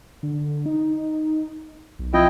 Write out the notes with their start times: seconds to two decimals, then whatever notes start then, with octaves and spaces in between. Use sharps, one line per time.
0.23 D3
0.66 D#4
1.99 B1
2.14 F3 C4 E4 F4 D#5 G5